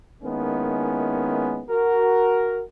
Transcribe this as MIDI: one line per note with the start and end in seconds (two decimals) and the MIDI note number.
0.23 1.63 51
0.23 1.63 56
0.23 1.63 58
0.23 1.63 59
0.23 1.63 61
0.23 1.63 64
1.70 2.62 66
1.70 2.62 70